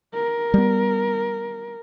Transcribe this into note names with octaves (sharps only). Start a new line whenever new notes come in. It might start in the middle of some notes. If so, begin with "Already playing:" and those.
A#4
G3 B3